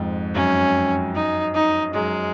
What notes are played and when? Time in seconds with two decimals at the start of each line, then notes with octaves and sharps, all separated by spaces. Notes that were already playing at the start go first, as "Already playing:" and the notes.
Already playing: F2 G#2
0.35 F#2 C#4
1.15 D#4
1.55 D#4
1.94 F#2 G#3